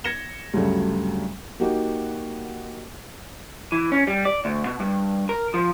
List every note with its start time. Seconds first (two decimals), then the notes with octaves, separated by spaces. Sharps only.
0.04 G#6 A#6 C#7 E7 G7
0.54 D2 G2 C#3 F#3 G3 A3
1.60 A#3 D#4 F#4 G4
3.72 E3
3.92 C#4
4.07 G3
4.25 D5
4.45 D2
4.66 B2
4.80 G2
5.29 A#4
5.54 F3